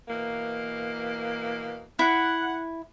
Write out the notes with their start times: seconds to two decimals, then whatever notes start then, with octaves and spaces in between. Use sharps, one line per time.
0.08 B2 E3 A#3
1.99 E4 F#5